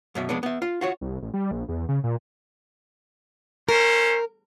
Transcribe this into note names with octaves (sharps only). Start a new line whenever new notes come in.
F#2 B2 E5
F2 G#3 B3 D4
B3 E5
F4
F4 F#4 C#5
C2
A1
G3
A#1
E2
C#3
A#2
A3 C#4 A#4 C5